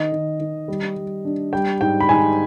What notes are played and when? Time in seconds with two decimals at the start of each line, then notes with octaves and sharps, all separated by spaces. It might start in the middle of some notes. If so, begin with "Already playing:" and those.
Already playing: D#3 D#5
0.12 D#3
0.40 D#3
0.68 G3
0.96 G3
1.25 D4
1.53 G3 G5
1.81 G#2 G5
2.00 B5
2.09 G#2 G#5